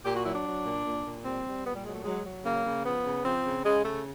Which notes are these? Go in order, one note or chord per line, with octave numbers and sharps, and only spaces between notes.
A#2 G4
F#4
F#3 E4
D4
F#3
A#2
A#2
A#2
G3 C4
G3
A#2 B3
G3
F#3 G#3
A3
F#3 G#3
F#3
C#3 A#3
C#3
F3 B3
C#3
F3 C4
C#3
C#3 G#3
C#3 A3